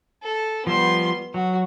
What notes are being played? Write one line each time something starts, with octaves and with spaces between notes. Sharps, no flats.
A4
F3 G3 B3 C6
F#3 F#4